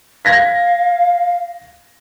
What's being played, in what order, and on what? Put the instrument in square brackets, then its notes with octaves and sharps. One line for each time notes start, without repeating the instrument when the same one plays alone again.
[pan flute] F5 [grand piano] G#6 A#6 B6